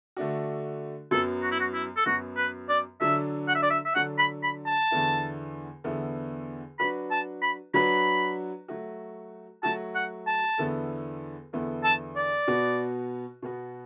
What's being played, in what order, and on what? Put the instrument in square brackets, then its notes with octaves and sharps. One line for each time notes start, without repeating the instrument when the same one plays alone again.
[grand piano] D3 A3 D4 F#4
[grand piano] F#2 F#3 B3 [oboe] A4
[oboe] F#4
E4
F#4
E4
A4
[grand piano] F#2 F#3 B3 [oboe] F#4
[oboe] B4
D5
[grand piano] D3 F#3 D4 A4 [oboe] E5
[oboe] F#5
E5
D5
E5
E5
[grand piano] D3 F#3 D4 A4 [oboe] F#5
[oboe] B5
B5
A5
[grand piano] E2 D3 B3 E4
E2 D3 B3 E4
[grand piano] F#3 D4 F#4 B4 [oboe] B5
[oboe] A5
B5
[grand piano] F#3 D4 F#4 B4 [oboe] B5
[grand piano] F#3 A3 F#4
[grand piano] F#3 A3 F#4 [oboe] A5
[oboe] F#5
A5
[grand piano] E2 D3 B3 E4 A4
E2 D3 B3 E4 A4
[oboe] A5
D5
[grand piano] B2 B3 F#4
B2 B3 F#4